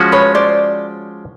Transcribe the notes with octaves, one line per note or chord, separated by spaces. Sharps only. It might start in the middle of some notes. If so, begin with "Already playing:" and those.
Already playing: F3 G#3 C#4 F#4
B4 C#5
C5 D5